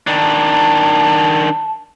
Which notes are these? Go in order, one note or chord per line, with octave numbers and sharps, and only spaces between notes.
D#3 D4 A5